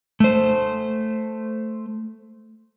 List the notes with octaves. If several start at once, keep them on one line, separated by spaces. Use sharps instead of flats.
A3 C5